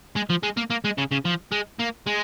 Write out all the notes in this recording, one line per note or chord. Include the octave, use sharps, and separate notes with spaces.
G#3
F3
G#3
A#3
A#3
G#3
C#3
C#3
F3
G#3
A#3
G#3